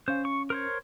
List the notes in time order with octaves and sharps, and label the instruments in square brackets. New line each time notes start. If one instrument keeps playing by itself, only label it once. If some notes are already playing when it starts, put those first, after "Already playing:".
[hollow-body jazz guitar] C#4 F5 [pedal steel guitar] C5
[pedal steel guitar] C#6
A#4 C5 C#5